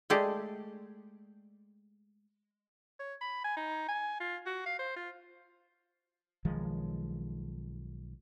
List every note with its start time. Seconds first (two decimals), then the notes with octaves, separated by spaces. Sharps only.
0.10 G#3 A3 G4 G#4 D5
3.00 C#5
3.21 B5
3.44 G#5
3.57 D#4
3.88 G#5
4.20 F4
4.46 F#4
4.66 F5
4.79 C5
4.96 F4
6.45 B1 D#3 F3 G#3